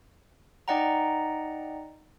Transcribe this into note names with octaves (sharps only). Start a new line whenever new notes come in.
D#4 D5 D#5 F#5 G5 A#5